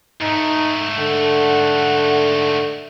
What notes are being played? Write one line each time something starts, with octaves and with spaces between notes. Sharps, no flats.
G#2 A3 D#4
D3 F#5